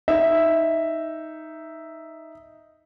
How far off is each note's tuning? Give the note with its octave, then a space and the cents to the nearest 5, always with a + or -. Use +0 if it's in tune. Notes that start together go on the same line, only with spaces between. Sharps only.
D#4 +5 E5 +0